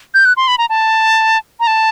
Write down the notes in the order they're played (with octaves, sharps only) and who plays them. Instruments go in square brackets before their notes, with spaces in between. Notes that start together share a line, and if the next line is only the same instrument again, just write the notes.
[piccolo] G6
F#6
C6
B5
A#5
A5
A#5
A5